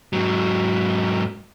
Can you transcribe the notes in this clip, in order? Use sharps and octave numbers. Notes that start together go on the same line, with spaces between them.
G#2 F#3